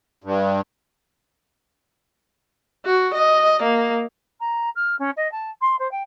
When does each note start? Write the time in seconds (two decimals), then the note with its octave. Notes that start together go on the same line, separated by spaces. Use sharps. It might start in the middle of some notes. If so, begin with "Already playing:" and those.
0.24 G2
2.85 F#4
3.14 D#5
3.62 A#3
4.39 A#5
4.75 F6
4.99 C#4
5.16 D#5
5.31 A5
5.61 C6
5.79 C5
5.91 G5